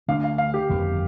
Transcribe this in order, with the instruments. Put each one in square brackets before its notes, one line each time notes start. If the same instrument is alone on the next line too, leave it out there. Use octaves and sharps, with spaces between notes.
[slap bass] D2 D3 A3 D4 [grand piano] F5
[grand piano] F5
F5
G4
[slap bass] G1 F2 D#3 A#3